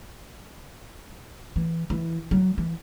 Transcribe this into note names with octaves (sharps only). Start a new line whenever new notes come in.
E3
E3
F#3
E3